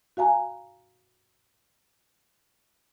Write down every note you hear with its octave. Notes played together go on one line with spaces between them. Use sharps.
F#4 F5 G#5 A#5